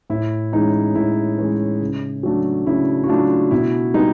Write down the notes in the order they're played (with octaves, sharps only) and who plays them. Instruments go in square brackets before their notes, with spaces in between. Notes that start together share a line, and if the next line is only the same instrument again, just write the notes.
[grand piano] A2 E4
E3 G#3 C#4 D#4
A2 E4
E3 G#3 C#4
C#3
F#3 A3 D4
C#3 E4
F#4
F#3 A3 D4 F4
B2 E4
G3 B3 D#4